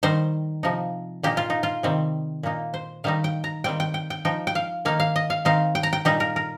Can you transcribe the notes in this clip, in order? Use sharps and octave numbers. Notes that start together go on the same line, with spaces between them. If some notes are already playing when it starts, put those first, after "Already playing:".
D#3 G3 D#4 C5
C3 F3 D#4
A#2 A#3 D#4 G4
F4
D#4
F4
C3 D#3 G3 C4
A#2 A#3 D#4
C5
D#3 G3 D#4 F5
G5
A#5
D#3 G3 C4 G5
G5
G5
G5
F3 D#4 G5
G5
F5
D#3 A#3 D#4 F5
F5
D#5
F5
D#3 C4 D#4 F5
G5
A#5
G5
A#2 G3 D#4 G4
A#4
A#4